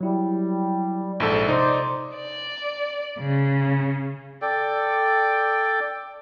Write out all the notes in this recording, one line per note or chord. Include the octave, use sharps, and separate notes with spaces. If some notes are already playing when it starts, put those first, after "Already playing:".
F#3 G3 E4
A#1 G#2 A4
C3 D#4 C5 D5 D#6
D5
C#3
A4 D5 G5